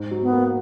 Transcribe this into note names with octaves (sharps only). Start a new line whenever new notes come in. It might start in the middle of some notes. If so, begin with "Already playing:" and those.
Already playing: G#2
F#3
B3
A#3